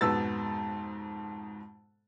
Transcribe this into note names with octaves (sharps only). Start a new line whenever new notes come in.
F2 G#2 B2 B3 E6 A6